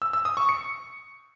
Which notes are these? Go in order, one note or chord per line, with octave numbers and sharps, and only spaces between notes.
E6
E6
D#6
C#6
C#7